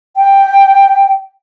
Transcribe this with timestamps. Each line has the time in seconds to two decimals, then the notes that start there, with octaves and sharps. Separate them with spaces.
0.17 G5